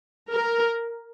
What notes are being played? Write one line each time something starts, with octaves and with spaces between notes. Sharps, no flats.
A#4